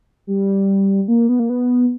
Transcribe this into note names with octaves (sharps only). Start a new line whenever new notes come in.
G3
A#3
B3
A#3
B3